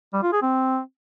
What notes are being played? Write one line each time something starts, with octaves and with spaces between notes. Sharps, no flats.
G3
F4
G#4
C4